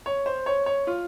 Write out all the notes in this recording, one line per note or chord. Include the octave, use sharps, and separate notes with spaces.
C#5
C5
C#5
C#5
F4